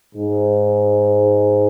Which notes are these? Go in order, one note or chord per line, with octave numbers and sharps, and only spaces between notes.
G#2